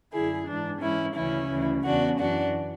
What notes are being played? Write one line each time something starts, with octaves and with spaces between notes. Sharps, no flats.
F#2 D3 E4 G#4
G#2 E3 D4
G#2 E3 C#4 E4
D2 C#3 E3 C#4 E4
D2 C#3 E3
E2 C#3 E3 D4 F#4
F#2 E3 D4 F#4